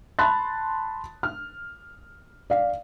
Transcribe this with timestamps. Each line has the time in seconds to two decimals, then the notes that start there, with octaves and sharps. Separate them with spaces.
0.19 A5 B5 C6 F#6 A6
1.23 F6
2.50 D5 F5